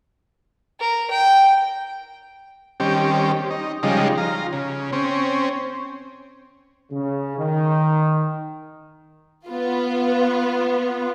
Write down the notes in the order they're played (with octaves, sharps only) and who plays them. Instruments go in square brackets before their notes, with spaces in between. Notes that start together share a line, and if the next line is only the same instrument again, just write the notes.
[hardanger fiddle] A#4
G5
[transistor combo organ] D#3 G3 C4 C#4 G4
D#4
C#3 F3 G3 G#3 D#4
F4 A#5
C#3
C4 C#4
[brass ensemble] C#3
D#3
[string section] B3 F4